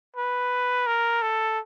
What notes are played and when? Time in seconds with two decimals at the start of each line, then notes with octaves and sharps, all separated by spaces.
0.16 B4
0.87 A#4
1.22 A4